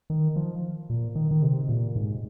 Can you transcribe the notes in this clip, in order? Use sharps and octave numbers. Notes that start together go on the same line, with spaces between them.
D#3
F3
A#2
D#3
D#3
C3
A#2
G#2